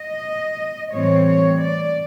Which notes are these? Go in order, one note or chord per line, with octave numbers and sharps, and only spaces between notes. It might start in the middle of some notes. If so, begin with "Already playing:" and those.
Already playing: D#5
A2 E3 G3 C4 C#5
C#5
D5